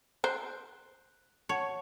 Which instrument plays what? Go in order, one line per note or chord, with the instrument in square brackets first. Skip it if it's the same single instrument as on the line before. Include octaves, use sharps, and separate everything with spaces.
[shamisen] C5 [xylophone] F#6
[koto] C#5 [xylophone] F#5 A5